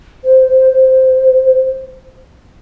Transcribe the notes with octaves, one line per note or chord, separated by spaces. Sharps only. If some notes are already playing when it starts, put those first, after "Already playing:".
C5
C5
C5